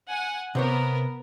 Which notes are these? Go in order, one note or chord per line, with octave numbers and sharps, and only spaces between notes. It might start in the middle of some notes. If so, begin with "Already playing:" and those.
F#5 G#5
C3 B3 A#4 C5 C#5